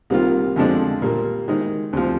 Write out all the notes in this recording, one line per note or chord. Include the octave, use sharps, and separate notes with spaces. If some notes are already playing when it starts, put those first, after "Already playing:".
C2 C3 D#3 A#3 F4
F2 D3 F3 G#3 D4
A#2 G3 A#3
D#3 G#3 D#4
D2 C3 F3